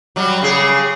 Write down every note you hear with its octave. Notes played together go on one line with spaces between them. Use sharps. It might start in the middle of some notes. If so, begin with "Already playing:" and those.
F#3 G3
C#3 G#4